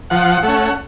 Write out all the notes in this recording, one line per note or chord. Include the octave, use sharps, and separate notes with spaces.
F3 F#5
A3 F#5
C#4